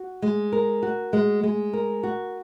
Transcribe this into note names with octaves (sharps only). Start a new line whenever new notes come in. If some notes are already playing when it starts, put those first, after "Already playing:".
Already playing: F#4
G#3
A#4
F#4
G#3
G#3
A#4
F#4